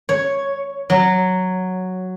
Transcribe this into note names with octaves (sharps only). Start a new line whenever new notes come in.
C#5
F#3